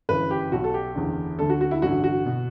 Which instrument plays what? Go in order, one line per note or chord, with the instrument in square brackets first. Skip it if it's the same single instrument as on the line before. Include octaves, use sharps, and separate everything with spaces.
[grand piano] G1 F#2 C#3 E3 B4
G4
B1 B2 F#4
A4
G4
F#1 E2 D3
D2 D3 A4
F#4
F#4
E4
A1 G2 D3 F#4
F#4
B2